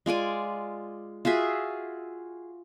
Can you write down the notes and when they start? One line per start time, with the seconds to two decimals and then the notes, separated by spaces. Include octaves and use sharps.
0.06 G#3 F4 D5 G#5
1.25 F4 F#4 G#4 E5